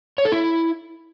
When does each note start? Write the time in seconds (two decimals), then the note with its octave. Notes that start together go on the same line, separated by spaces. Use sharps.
0.18 C#5
0.25 A4
0.32 E4